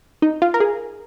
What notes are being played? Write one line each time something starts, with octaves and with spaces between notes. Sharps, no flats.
D#4
F4
A#4
G#4